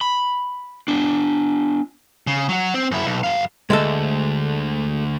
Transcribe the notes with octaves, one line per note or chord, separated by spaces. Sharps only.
B5
B3 D4
C#3
F#3 F#4
C4
F#2 E4
B1
F#2 F5
D2 G#3 A3 A4